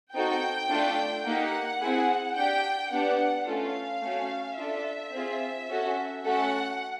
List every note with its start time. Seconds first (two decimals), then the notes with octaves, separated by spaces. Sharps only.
0.14 C4 D#4 F#4 A4 G5
0.69 A3 D4 F4 A4
1.25 A#3 D#4 G4 F#5
1.81 C4 E4 G#4
2.36 D4 G4 G5
2.91 B3 D4 G4 F#5
3.47 A3 C#4 F4 A4 F5
4.02 A3 C#4 F#4
4.58 D4 F4 A4 E5
5.13 C4 F4 G#4
5.69 C#4 F#4 A4
6.25 A3 C#4 F#4 A4 F#5